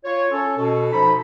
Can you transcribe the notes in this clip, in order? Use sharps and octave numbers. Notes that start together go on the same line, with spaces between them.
F4 C#5
C#4 A4
B2 A4
F3 D#4 B5